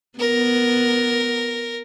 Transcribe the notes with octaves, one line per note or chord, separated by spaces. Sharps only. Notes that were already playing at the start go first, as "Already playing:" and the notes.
B3 A#4